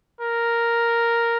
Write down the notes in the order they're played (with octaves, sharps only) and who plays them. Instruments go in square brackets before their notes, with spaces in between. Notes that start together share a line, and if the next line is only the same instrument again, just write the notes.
[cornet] A#4